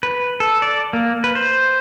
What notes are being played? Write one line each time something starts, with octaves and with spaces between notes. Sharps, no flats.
B4
A4
D5
A#3
B4
C5